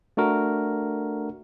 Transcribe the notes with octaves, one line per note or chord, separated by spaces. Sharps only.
A3 D4 F#4 A#4